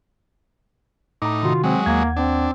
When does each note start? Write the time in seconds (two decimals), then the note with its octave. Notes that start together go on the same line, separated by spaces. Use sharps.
1.22 A2 D#4 A#5 D6
1.43 C3 D#3 F4 F#4
1.64 F#3 G#3 C4
1.86 D#2 A#3 F#5 G#6
2.17 C4 D4